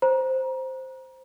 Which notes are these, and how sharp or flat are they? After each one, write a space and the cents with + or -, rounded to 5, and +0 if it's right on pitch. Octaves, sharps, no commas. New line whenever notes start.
C5 +0 A#5 +30